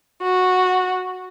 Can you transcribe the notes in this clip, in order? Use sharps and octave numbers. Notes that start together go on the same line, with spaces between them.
F#4